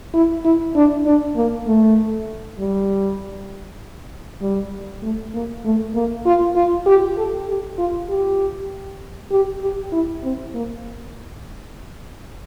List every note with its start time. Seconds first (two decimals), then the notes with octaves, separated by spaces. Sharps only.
0.14 E4
0.45 E4
0.76 D4
1.05 D4
1.36 A#3
1.67 A3
2.59 G3
4.41 G3
5.02 A3
5.34 A#3
5.65 A3
5.95 A#3
6.25 F4
6.55 F4
6.86 G4
7.17 A4
7.48 G4
7.78 F4
8.09 G4
9.32 G4
9.62 G4
9.92 E4
10.23 C4
10.54 A#3